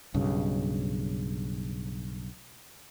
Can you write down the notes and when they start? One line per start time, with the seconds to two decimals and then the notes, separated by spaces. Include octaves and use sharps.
0.14 B1 G2 C#3